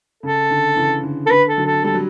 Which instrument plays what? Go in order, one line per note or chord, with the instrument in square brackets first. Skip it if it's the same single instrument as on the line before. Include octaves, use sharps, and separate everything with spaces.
[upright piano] C#3 [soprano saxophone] A4
[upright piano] D3
C#3 E3
D3
[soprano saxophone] A4
[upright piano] D3 [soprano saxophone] B4
[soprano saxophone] A4
[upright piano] D3 F#3
[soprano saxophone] A4
[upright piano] G3 [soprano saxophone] A4
[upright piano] F#3